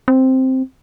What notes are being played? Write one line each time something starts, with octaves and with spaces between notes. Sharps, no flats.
C4